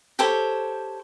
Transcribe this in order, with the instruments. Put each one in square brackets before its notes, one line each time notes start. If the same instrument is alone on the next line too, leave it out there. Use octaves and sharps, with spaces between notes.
[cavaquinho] G4 A4 C5 C#5